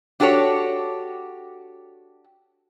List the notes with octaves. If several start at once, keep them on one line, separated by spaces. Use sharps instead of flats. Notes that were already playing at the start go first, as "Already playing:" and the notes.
D4 F#4 G4 A4 C#5